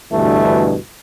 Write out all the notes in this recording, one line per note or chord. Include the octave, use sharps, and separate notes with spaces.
D2 G2 B2 E3 A3